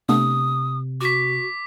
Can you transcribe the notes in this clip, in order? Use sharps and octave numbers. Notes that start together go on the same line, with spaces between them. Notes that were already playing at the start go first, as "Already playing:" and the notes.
C3 A3 B3 D4 D#6
F#4 D6 B6